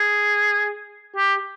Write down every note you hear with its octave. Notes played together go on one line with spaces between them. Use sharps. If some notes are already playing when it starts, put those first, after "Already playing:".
Already playing: G#4
G4